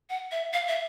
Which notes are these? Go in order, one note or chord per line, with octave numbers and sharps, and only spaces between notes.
F#5
E5
F5
E5